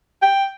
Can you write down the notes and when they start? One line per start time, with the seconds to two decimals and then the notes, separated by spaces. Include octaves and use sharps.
0.22 G5